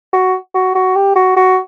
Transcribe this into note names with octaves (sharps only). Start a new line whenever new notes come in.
F#4
F#4
F#4
G4
F#4
F#4